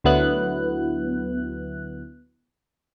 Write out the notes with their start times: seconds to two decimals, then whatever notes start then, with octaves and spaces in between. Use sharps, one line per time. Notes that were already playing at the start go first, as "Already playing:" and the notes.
0.04 D2 D3 F#3 B3 E4 F#6